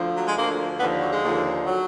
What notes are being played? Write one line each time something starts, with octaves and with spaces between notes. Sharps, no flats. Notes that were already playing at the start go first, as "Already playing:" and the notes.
Already playing: D2 D3 F3
F#3
G#3
D2 D3 F3 A#3
D#2 D3 F3 B3
F#3
G#3
D#2 D3 F3
F#3